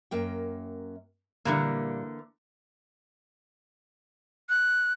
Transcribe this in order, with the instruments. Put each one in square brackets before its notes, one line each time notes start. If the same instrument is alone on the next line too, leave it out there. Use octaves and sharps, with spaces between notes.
[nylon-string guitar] F#2 A#3 G5
[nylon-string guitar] A#2 G3 [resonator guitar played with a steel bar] D3 E3 A#3
[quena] F#6